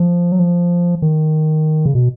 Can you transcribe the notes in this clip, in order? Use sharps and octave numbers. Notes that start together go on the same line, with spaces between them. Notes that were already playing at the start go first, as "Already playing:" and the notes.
Already playing: F3
F#3
F3
D#3
C#3
B2